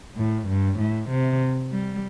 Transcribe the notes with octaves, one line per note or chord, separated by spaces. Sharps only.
A2
G2
A2
C3
G3